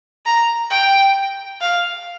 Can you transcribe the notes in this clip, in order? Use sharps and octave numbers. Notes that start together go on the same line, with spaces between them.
A#5
G5
F5